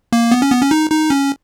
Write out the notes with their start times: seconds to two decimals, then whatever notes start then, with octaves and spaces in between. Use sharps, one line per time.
0.13 A#3
0.31 B3
0.42 C#4
0.51 B3
0.61 C#4
0.71 D#4
0.90 D#4
1.10 C#4